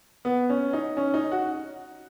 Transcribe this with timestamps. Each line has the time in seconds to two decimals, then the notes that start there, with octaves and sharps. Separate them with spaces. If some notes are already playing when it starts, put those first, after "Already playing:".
0.25 B3
0.50 C#4
0.73 D#4
0.97 C#4
1.14 D#4
1.31 F#4